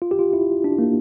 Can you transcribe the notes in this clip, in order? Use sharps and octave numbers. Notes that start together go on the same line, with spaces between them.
F4
G4
F4
E4
D4
A#3